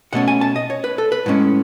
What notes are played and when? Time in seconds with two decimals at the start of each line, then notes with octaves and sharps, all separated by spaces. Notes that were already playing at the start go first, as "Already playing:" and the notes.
0.13 B2 A3 C#4 F#5
0.28 G#5
0.41 A5
0.56 D#5
0.70 C#5
0.84 B4
0.98 A4
1.12 B4
1.26 A2 G#3 C#4